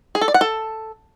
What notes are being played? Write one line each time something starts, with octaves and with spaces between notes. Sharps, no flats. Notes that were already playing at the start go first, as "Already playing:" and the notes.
G#4
A4
D5
F#5
A4